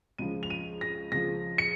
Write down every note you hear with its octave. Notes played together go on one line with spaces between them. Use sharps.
C#2 C#3 F3 D#7
F7
D#7
A#6
C#2 C#3 F3 A#6
C#7